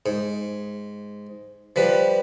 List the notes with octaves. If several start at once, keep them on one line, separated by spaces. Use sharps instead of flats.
G#2
F3 G3 B4